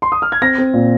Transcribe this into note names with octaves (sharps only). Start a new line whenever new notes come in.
C6
D#6
F6
G#6
C4 A#6
C4
A#2